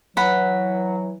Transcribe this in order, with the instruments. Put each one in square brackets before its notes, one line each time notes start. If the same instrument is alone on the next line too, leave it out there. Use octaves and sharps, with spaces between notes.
[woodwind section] E3 F#3 [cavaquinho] F#5 B5